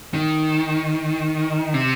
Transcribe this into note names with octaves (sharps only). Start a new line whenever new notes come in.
D#3
C3